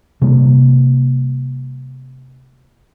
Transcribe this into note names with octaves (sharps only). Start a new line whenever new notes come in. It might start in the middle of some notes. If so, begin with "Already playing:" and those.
C3 G3 A#3